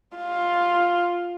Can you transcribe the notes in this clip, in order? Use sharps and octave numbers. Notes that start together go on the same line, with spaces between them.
F4